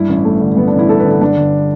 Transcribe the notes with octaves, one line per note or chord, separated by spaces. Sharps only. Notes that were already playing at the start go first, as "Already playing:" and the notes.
Already playing: G2 E4
A1
A3
D3
G2 B3
D4
A1
E4
A3 A4
B4
D3 A4
G2 D4
G1